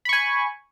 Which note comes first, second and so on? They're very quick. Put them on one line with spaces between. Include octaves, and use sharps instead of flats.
B5 C#6 G#5